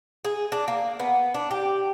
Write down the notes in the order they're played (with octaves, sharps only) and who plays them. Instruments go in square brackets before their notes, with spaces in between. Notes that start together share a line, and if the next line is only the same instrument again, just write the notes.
[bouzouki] G#4
D4
A#3
B3
D4
G4